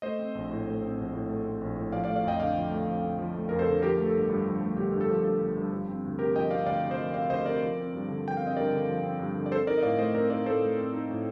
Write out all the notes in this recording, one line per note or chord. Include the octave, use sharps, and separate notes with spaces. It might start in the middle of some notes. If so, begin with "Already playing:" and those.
A3 C5 D#5
C4
A#1
A2
A3
C4
A#1
A2
A3
C4
A#1
A2
F3 D5 F5
D5 F5
A3
D5 F5
F2 D#5 G5
D3 D5 F5
F3
A3
F2
D3
F3
A3
F2 A#4
A4 C5
D3
F3 G4 A#4
A3
A4
G1
G2
F3
A3
G1 G4
G2
A4
F3
A3 A4
G1
G2
F3
C4
D2
C3 G4 A#4
F3 D#5 G5
C4 D5 F5
D2 D5 F5
C3
C5 D#5
F3
C4 D5 F5
D2 C5 D#5
C3 A#4 D5
F3
C4
G2
D3
F3 G5
C4 F5
D#5
G2 A#4 D5
D3
F3
C4
G2
D3
D5
C4 A4 C5
D#4 A#4 D5
D#5
A2 D5 F5
A3 C5 D#5
C4 A#4 D5
D#4 A#4 D5
A2 A4 C5
A3
C4
D#4
A2